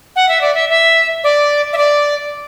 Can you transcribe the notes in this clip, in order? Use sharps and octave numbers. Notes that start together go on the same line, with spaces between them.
F#5
E5
D5
E5
E5
D5
E5
D5